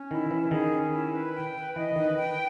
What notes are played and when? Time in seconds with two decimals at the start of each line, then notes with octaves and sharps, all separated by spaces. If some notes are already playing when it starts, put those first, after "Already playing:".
Already playing: C#4
0.11 D#3 E4
0.31 E3 C#4
0.51 D#3 G#4
0.72 C#4
0.93 E4
1.13 B4
1.34 G5
1.55 B4
1.76 E3 D#5
1.96 D#3 B4
2.17 G5